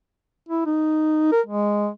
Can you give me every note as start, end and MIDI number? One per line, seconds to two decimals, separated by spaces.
0.49 0.65 64
0.66 1.29 63
1.32 1.41 70
1.46 1.89 56